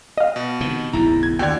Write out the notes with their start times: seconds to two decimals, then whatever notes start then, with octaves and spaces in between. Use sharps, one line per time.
0.18 D#5 F5
0.36 B2
0.61 C3 D#3
0.93 D1 B1 F#2 E4 A#5
1.23 G#6
1.39 D#2 D3 F#4 D5 G5 G#6